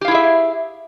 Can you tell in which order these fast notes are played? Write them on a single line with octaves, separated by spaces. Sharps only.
G4 F5 E4 G#4 E5